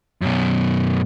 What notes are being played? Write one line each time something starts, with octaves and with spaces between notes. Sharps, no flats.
F#2 B2